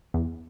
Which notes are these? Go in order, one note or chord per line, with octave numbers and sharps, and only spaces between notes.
E2